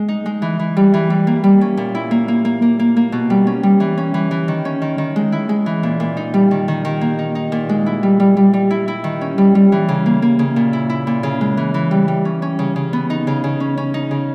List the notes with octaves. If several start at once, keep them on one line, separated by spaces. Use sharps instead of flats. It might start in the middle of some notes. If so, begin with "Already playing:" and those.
Already playing: G#3
D#4
G#3
E3
E3
G3
E3
G3
A#3
G3
C#4
A#2
E4
A#3
A#3
A#3
A#3
A#3
A#3
B2
G3
C#4
G3
E3
C#4
E3
E3
D#3
C#4
D#3
D#3
G#3
E4
G#3
E3
A#2
A#2
D#4
G3
D#3
D#3
D#3
A#3
D#4
D#4
A#2
G#3
E4
G3
G3
G3
G3
E4
E4
D#3
C#4
G3
G3
E3
C#3
A#3
A#3
C#3
A#2
E4
E4
A#2
C#3
G#3
E3
E3
G3
G3
C#4
C#4
C#3
C#3
B3
D#4
C#3
C#3
C#4
C#4
D#4
C#3